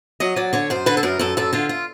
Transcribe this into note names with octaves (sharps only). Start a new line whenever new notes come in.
F#3 D#5
F#3 D5
D3 C#5
F#2 C5
D3 B4
A4
F#2 A#4
F#2 A4
F#2 A4
D3 F4
F4